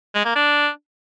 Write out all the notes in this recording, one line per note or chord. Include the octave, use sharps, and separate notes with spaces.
G#3
A#3
D4